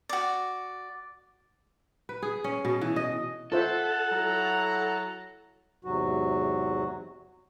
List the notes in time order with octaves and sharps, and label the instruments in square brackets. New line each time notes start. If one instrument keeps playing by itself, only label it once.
[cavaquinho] F#4 D5
[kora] B4
G#4
C#4
B2
E3
D#5
[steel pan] F4 C5 E5 [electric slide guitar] A4 [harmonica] F#5
[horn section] F#3 E4 A#5
[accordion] E2 G#2 C3 F#3 F#4